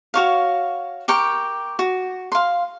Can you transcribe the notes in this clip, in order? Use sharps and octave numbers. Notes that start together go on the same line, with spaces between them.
F#4 C#5 F5
G4 A#4 G5 C#6
F#4
F5 C6